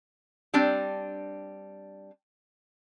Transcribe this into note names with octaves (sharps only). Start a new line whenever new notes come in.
G3 C4 D4 G5